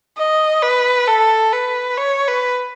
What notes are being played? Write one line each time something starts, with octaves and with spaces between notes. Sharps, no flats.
D#5
B4
A4
B4
C#5
B4